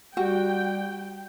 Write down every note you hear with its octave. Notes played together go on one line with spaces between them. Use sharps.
G3 F#4 G4 F#5 G5